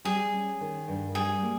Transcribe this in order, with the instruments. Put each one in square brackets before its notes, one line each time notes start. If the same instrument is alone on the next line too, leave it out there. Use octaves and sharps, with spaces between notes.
[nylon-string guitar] G3 [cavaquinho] G#4
[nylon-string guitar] C#4
D#3
G2
[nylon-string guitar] G3 [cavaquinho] G#4
[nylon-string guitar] A#3